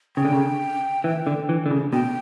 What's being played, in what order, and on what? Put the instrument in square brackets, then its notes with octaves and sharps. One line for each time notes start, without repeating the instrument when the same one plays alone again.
[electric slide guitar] C#3 [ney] G5
[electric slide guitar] D3
C#3
E3
D3
E3
D3
C#3
[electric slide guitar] B2 [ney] G5